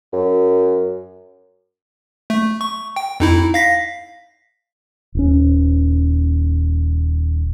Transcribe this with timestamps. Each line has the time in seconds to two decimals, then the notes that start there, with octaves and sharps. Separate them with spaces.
0.13 F#2
2.30 A3
2.61 C#6
2.96 G5
3.20 F2 D#4 E4
3.54 F5 A#6 B6
5.15 D#1 C#4